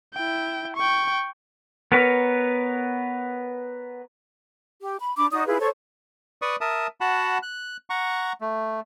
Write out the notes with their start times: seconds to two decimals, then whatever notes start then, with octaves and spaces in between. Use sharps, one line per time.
0.14 E4 G5
0.76 G5 C#6
1.92 B3 A#4 B4 C#5
4.81 G4
5.00 B5
5.16 D4 B5 D6
5.31 D#4 F#4 D5 D#6
5.46 E4 F4 G#4 B4
5.60 A4 C5 C#5 C#6
6.42 B4 D5 C#6 D#6
6.61 A#4 E5 A5 D#6
7.01 F#4 F#5 A5 B5
7.43 F#6
7.90 F#5 A#5 C#6
8.41 A3